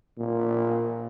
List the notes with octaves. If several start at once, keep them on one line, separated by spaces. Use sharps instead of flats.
A#2